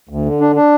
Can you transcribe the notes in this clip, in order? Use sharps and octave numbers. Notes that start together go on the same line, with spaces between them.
D2
D3
D4
D4